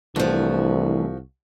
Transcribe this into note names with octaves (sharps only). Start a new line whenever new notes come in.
C2 E3 F3 A3 D4 F#4